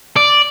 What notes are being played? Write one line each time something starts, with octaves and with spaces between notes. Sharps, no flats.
D5